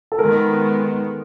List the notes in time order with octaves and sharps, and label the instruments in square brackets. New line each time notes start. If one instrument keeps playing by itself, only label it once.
[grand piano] A4
[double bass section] D#3 G#3 B3 [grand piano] A#4